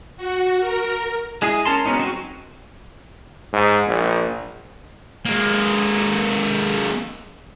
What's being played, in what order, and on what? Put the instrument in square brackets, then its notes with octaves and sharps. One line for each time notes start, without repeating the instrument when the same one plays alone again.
[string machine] F#4
A#4
[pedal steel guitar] G#3 E4 G#4 D#5
C#4 A#4 A5 C6
F#3 G#3 B3 C#4 D#4
F#3 G#3 C4 C#4 F#4
[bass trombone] G#2
A#1
[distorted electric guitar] G#3 A#3